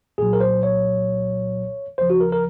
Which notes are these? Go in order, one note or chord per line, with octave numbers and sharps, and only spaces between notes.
C2 A#2 F#3 G#4
A#4
C5
C#5
D#2 C#3 F3 C5
F#4
A#4
A#4